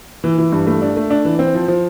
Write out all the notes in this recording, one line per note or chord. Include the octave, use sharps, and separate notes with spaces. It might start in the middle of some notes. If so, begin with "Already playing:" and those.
E3
E3
G2
A3
D4
A3
D4
E3
C4
F3
F3